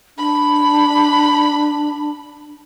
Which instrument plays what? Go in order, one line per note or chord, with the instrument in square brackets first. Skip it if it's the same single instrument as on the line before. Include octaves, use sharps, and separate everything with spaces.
[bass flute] D4 [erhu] B5